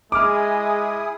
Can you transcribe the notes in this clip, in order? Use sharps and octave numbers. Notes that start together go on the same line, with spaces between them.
G#3 E4 G#4 D6 D#6 F6